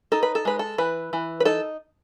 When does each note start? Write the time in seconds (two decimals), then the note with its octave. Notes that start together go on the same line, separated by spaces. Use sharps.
0.12 D#4 A4
0.23 B4
0.35 A4
0.45 G#3 B4
0.59 A4
0.78 E3 B4
1.13 E3
1.40 B4
1.45 D#4 A4